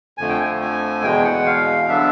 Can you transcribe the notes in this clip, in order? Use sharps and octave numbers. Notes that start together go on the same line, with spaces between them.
F2 D3 F3 A3 G#5
G5
G#5
G#5
E2 B2 G#3 G5
F#5
F5
D3 F#3 B3 D4 E5